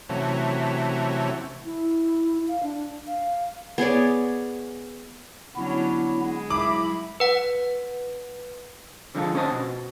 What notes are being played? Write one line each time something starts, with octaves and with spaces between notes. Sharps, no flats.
C3 E3 F#3 A3 C#4
E4
F5
D4
F5
B3 G#4 C#5 D5
D3 F#3 B3 C#4 E4
G#3
F#3 E4 B5 D6
B4 F#5
D3 F3 G#3 C#4 F4 A4
D2 C#4 C5 D#5 A5
B2